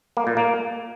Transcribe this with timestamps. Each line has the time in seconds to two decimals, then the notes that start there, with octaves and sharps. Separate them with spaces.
0.17 A#3
0.27 A#2
0.37 A#3